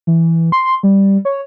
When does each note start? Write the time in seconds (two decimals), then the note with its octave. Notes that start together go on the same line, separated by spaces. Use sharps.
0.07 E3
0.52 C6
0.83 G3
1.25 C#5